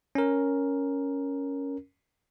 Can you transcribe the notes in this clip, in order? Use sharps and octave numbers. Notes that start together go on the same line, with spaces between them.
C#4 A#4